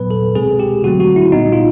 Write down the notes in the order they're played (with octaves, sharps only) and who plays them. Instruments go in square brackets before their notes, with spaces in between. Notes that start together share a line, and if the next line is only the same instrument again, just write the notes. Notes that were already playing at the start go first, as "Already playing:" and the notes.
Already playing: [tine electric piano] A#2 F#3 B3 B4
A4
B2 G#3 C4 G#4
G4
D3 F#3 A3 C4 F#4
F#4
E4
A#2 G3 B3 D#4
F4